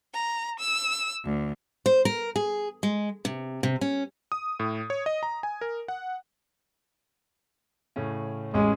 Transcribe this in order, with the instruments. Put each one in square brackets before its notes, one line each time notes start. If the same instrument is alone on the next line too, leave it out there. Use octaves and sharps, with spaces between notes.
[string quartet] A#5
E6
D2
[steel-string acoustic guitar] C5
A#4
G#4
G#3
C3
C3
C#4
[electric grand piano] D#6
A2
C#5
D#5
A#5
G#5
A#4
F#5
[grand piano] A2 C#3 C#4
[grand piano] A1 C#4 [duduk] G#3